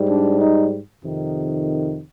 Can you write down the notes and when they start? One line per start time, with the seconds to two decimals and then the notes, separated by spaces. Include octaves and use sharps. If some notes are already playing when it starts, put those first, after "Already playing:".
Already playing: G#2 G3
0.09 D4
0.40 D#4
1.02 F2 C3 D#3